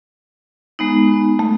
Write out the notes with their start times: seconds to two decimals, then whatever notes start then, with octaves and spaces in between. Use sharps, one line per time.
0.79 G#3 B3 D#4
1.39 A3